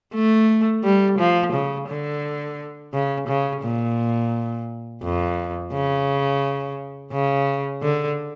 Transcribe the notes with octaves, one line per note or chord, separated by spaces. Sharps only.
A3
G3
F3
C#3
D3
C#3
C#3
A#2
F2
C#3
C#3
D3